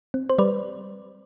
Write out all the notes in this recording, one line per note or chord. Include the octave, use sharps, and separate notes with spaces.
C4
C5
G3 B4 D5